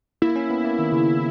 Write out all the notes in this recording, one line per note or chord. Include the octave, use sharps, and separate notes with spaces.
A#3 E4
C#4
B3
A#3
D#3
C#3